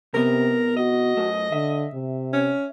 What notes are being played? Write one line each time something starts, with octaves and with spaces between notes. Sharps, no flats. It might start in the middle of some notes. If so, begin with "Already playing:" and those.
C2 C3 B3 A#4
F#4 D#5
F#2 A3
D3 E5
C3
C#4